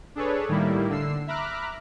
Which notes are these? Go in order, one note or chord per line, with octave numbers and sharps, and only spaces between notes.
D4 G#4 A4 B4 C#5
A2 D#3 G3 A#3 E4
D3 E6 C7
E5 A#5 B5 D6 F6 F#6